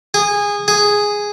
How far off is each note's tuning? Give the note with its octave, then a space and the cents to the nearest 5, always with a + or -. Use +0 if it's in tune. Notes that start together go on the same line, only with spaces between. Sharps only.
G#4 -20
G#4 -5